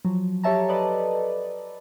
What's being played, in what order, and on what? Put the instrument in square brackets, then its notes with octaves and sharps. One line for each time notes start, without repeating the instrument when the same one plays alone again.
[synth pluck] F3 F#3
G4 A4 C#5 E5 A5 A#5
A4 B4 D5 D#5 A5